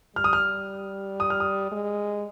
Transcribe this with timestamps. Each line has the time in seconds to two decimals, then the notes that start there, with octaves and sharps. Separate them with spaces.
0.16 G3 F6
0.24 D#6
0.33 F6
1.20 D#6
1.30 F6
1.40 D#6
1.71 G#3